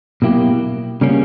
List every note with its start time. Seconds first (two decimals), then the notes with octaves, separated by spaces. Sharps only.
0.22 B2 F#3 A#3 E4 G4
1.01 C#3 G3 A#3 C#4